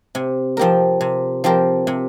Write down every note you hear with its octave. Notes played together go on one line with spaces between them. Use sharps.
C3
F3 C4 G4 A#4
C3
F3 C4 G4 A#4
C3